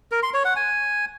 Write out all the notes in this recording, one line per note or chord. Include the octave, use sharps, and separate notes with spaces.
A#4
C6
C#5
F#5
G#5